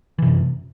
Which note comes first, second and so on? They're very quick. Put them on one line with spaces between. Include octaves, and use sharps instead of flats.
E3 C3 F#2